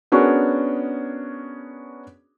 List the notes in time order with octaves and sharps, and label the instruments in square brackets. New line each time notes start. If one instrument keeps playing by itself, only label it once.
[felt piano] B3 C#4 D4 F#4 G#4 A#4